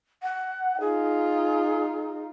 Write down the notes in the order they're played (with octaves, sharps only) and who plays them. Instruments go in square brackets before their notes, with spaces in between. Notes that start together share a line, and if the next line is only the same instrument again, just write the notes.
[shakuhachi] F#5
[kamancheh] D#4 F4 [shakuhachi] G#4